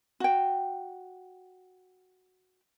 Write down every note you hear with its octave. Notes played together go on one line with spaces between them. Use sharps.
F#4 G5